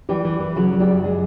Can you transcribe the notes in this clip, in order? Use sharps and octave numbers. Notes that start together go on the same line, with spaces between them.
E3 G3 G4
E3
E3
C#3 F#3 F#4
F#3
G3 G4
F#2
F#3 G#3 G#4